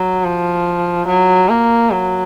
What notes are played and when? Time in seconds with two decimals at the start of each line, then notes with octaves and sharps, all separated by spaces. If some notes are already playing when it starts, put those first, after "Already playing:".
Already playing: F#3
0.24 F3
1.07 F#3
1.49 A#3
1.91 F#3